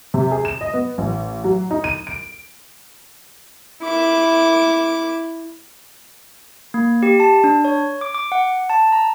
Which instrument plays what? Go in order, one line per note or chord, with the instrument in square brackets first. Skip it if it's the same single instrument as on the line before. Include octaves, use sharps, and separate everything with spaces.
[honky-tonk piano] C3
G#4
E7
D#5
B3
A1
F#3
D#4
D#7
D7
[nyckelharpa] E4 D6
[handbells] A#3
G4
A5
D4
C#5
D6
D6
F#5
A5
A#5